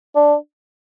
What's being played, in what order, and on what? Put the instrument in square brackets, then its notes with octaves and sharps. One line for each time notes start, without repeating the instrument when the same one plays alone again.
[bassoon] D4